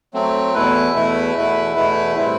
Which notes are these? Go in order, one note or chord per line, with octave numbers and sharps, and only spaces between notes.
F#3 A3 C4
E2 B2 A3 E4 B4
E2 B2 A3 E4 B4
E2 B2 A3 E4 B4
E2 B2 A3 E4 B4
A2 G3 C4 E4 B4